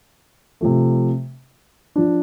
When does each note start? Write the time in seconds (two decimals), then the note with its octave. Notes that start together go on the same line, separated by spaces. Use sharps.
0.61 C3 F3 A3
1.96 F3 D4